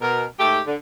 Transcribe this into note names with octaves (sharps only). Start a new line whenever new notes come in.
B2 A#4
G#2 A3 G4
D3